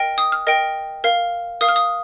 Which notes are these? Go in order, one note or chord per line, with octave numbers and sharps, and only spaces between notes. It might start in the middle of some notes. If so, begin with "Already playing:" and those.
Already playing: A#4 D#5 G5
D#6
F6
A#4 D#5 G5
A#4 F5
A#4 F5 D#6
F6
D#6